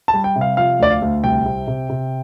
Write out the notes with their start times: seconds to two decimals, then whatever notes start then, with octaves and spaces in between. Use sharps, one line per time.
0.08 A5
0.14 G3
0.24 G5
0.36 C3
0.41 F5
0.57 F3 F5
0.80 D2 D5
0.90 F5
1.02 D2
1.24 C2 G5
1.46 C3
1.67 C3
1.90 C3